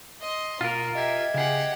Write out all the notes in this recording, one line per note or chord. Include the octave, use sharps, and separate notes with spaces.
D#5 C6
B2 A#3 F4 A#4
G4 D#5 E5 G#6
C#3 G4 G#4 F#5